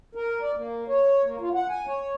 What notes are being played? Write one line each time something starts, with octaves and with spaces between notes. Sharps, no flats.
A#4
D5
A#3
C#5
A#3
F4
F#5
G#5
C#5